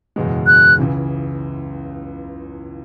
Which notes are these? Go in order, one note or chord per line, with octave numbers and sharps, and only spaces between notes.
F#1 E2 B2 G#3
F#6
C#2 C#3 E3